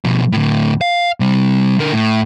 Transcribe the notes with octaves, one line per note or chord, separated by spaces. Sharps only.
B2 F3
D2 A2
F5
C3 G3
D3 A#4
A2